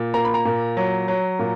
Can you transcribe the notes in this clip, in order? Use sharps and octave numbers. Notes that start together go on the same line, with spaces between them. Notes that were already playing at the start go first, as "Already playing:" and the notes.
Already playing: A#2
A#3 A#5
B5
A#5
A#2
F#3
F#3
A#2